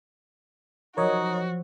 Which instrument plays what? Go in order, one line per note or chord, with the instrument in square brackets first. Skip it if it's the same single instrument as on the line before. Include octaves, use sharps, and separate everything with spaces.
[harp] F3 F#3 [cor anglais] D#4 [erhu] F#4 [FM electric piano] A#4 C#5 D#5